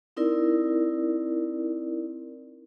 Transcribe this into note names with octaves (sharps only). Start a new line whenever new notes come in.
C4 D#4 E4 A#4 D5